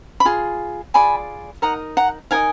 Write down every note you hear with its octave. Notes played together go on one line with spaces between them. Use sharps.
B5
F4 G#4
F4 G#4 D5 G#5 B5
D#4 A#4 D#5 F#5 A#5
F#5 A#5
D#4 A#4 D#5 F5 G#5